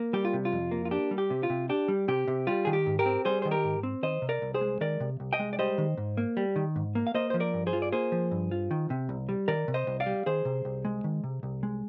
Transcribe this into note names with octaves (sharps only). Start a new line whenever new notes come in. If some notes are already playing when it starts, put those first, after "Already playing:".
Already playing: A#3
G3 G4
F4
C3
F4
F2
A#3
F4
D4 G4
G3
G4
C3
F4
C3
D4 G4
G3
C3 G4
C3
G3 F4
D#3 G#4
G4
G#2
G4 A#4
C4
G3 G#4 C5
D#3 C5
G4 A#4
G#2
C4
D#3 C5 D#5
C3
A#4 D5
C2
G#4 C5
G#3
D#3 A#4 D5
C3
C2
D#5 G5
G#3
D5
G3 C5 D#5
D#3
G#2
A#3
G3
D#3
G#2
A#3
F5
A#3 C5 D#5
F3 C5
A#4 D5
G2
G#4 C5
F4
D5
A#3 G#4 C5
F3
G2
F4
D#3
C3
C2
G3
D#3 A#4 D5
C3
C5 D#5
C2
D5 F5
G3
D#3 G#4 C5
C3
C2
G#3
D#3
C3
C2
G#3